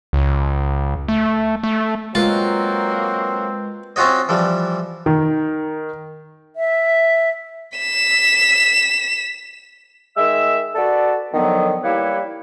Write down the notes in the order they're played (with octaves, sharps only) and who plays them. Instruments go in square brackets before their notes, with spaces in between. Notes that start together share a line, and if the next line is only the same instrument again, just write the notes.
[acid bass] C#2
A3
A3
[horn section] F#3 A#3 F#4 [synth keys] G#3 B4 E6 [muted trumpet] C4 [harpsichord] F4
[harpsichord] C4 C#4 F4 F#4 C#5 D#5
E3 F3 G3
[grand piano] D#3
[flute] E5
[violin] B6 E7
[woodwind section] D#3 G#3 E5 E6
F#4 A4 B4 D5
D3 D#3 F3 F#3 B3
G3 A#3 E4 G4 B4 C#5